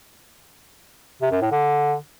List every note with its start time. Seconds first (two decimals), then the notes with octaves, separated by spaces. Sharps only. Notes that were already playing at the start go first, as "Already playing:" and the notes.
1.22 C3
1.32 F#2
1.42 A2
1.52 D3